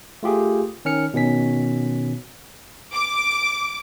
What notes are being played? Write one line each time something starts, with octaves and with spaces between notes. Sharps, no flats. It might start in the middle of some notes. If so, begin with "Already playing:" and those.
A3 F4 G4 G#4
D#3 C#4 F6 C#7
B2 D#3 C#4 B6
D6